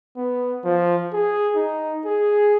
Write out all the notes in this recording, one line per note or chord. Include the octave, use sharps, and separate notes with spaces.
B3
F3
G#4
D#4
G#4